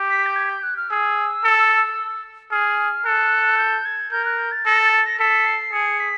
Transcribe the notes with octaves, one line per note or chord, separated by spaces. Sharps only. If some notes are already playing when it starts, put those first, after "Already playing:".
Already playing: G4
B6
G6
G#6
G6
F#6
F6
G#4 E6
A4
G#4 F6
A4 F#6
G6
G#6
A#4 G6
F#6
G6
A6
A4 A#6
A6
A6
A#6
A4 B6
C7
G#4 C#7
B6